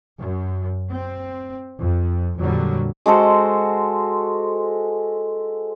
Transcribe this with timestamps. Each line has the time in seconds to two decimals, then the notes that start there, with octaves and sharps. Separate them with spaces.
0.18 F#2
0.90 C4
1.81 F2
2.38 F2 A#2 D3 F#3 G3
3.06 G#3 F#4 A4 C5